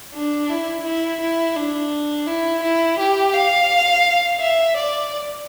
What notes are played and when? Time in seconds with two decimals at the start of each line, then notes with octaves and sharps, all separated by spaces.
0.14 D4
0.50 E4
0.85 E4
1.20 E4
1.56 D4
2.27 E4
2.63 E4
2.99 G4
3.34 F5
4.40 E5
4.76 D5